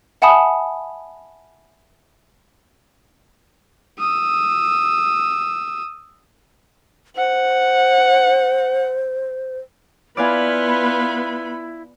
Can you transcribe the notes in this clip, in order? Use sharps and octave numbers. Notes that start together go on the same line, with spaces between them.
E5 F#5 G#5 A5 B5 D#6
D#6 E6
C5 F#5
B3 E4 F4 B4 D5 F5 G#5 B5